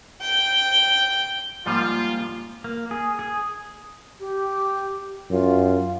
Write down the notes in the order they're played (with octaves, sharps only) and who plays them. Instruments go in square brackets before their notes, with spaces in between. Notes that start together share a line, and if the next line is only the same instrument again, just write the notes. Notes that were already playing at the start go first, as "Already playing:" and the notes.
[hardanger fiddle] G5
[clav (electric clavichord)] G#2 F3 G3 [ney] A#3 [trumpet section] F4
[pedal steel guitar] A#3
G#4
G#4
[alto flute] G4
[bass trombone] F#2 [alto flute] F4